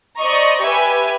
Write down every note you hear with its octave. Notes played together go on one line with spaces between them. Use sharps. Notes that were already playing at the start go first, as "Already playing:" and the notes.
C5 D5 D#5 A#5 C#6
G4 B4 E5 G#5